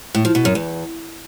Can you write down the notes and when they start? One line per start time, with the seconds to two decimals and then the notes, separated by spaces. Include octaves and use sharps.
0.15 A2
0.25 F3
0.35 B2
0.45 F#2
0.55 E2